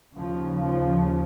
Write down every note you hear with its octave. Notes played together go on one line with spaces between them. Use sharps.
D#2 C#3 F3
F3